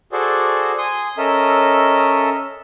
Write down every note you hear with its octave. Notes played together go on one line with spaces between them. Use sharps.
F#4 G#4 A4 C5 D5
G#5 C6 D#6
C#4 A4 A#4 D#5 E5 E6